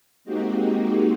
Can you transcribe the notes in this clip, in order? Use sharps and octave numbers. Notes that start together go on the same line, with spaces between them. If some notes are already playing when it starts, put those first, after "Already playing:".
G#3 A#3 C4 D#4 F#4 G4